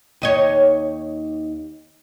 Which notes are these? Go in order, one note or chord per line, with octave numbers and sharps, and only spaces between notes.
D#2 D#4 C#5